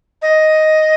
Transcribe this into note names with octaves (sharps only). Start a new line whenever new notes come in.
D#5